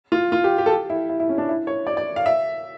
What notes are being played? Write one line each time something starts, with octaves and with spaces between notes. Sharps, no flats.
F4
F4
G4
G4
A4
G4
E4
E4
E4
C#4
D4
E4
C#5
D5
D5
F5
E5